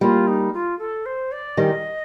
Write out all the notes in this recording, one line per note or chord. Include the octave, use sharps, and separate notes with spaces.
G3 A#3 F4
D#4
F4
A4
C5
D5
D#3 G3 D#5